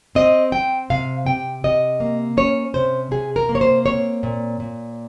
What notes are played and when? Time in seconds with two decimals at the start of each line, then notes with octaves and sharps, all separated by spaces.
0.15 C4 D#5
0.52 C4 G5
0.90 C3 F5
1.26 C3 G5
1.64 C3 D#5
2.00 A#3
2.37 C#4 C#5
2.74 C3 C5
3.11 C3 G#4
3.36 A#4
3.49 A#3
3.55 C#5
3.61 C5
3.86 C4 C#5
4.23 A#2
4.60 A#2